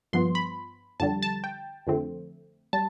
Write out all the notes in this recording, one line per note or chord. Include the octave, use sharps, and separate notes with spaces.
G2 F3 B3 C6
B5
F2 D3 G3 A5
A5
G5
F2 D3 A3 C4
G3 A5